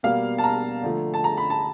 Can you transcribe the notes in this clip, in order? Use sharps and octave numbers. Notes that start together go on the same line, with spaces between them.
B2 G3 A#3 F5
A5
A#5
D3 F3 A3
A5
A#5
B5
A5